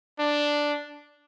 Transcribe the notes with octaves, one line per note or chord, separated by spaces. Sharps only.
D4